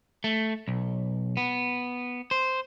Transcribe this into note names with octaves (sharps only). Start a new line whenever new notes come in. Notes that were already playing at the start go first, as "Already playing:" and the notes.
A3
B1
B3
C5